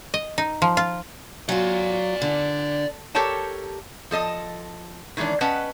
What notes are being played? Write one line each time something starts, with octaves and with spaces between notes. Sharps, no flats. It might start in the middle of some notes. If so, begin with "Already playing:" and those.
D#5
D#4
F3
F4
F#3 F4 D5 G#5
D3
G4 A4 A#4 C#5 G5 A5
F3 A4 D#5 A5
D#3 E3 G#3 C#4 D4
C#4 B4 D#5 F#5 G5 A5